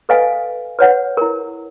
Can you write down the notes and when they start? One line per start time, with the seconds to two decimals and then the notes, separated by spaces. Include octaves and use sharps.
0.09 A4 B4 D#5 F5 G#5
0.79 B4 C#5 F#5
1.17 E4 A#4